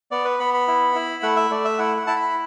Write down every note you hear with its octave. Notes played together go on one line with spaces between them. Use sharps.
B3 D5
B4
B3 B5
B5
E4
E4
A3 F#5
E5
A3 D5
E5
E4 F#5
F#5
E4 A5
B5